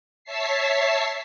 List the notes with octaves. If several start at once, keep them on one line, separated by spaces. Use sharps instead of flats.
C#5 E5 A5 B6 C7